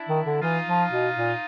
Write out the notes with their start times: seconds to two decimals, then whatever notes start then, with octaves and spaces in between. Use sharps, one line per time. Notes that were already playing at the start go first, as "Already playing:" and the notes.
Already playing: D4 E4
0.09 D#3
0.26 D3
0.42 E3 D#4 F4
0.67 F3
0.91 B2
1.16 A#2